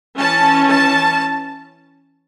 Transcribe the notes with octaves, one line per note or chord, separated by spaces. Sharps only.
E3 C#4 A5
A5